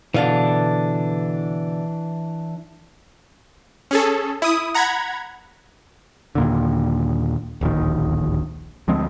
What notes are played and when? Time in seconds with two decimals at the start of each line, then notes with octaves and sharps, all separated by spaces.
0.14 B2 D3 E3 D4 F5
3.91 C#4 G#4 A4
4.42 E4 D#6
4.74 F#5 A#5 B5 G#6
6.35 D#2 A#2 D3
7.61 D1 A#1 D#2 D#3
8.88 D2 F3 G#3 C4